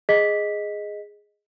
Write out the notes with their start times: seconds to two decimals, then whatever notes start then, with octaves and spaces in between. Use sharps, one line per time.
0.09 G#4 D#5 B6